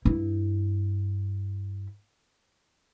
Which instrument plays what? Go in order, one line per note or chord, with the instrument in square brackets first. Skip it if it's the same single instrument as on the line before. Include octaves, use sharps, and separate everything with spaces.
[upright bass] G2 E4